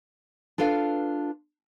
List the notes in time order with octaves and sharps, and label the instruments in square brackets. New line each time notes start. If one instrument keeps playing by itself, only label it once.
[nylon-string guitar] D4 F4 A4 B4 F5